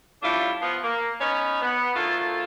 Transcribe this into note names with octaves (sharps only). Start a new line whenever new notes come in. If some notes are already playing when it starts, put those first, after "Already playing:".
G3 A3 C#4 D4 E4 F4
F3 B3
A#3
B3 C#4 D#4 B4 C#5 D#5
B3
D2 D3 D#3 A3 F4